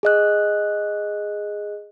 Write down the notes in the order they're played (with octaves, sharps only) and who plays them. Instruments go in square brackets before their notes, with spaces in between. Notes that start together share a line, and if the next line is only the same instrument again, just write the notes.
[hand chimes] G#4 D#5 F#6